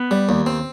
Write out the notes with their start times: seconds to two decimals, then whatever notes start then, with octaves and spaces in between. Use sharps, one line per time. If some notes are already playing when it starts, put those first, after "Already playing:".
Already playing: B3
0.11 G3
0.29 D#2
0.46 C4